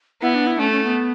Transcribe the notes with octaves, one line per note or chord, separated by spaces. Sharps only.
B3 E4
D4
E4
A3 C#4
C#4
B3